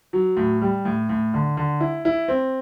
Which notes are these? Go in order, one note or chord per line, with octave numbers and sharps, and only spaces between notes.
F#3
A2
G3
A2
A2
D3
D3
E4
E4
C4